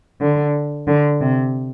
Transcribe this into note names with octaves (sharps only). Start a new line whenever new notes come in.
D3
D3
C3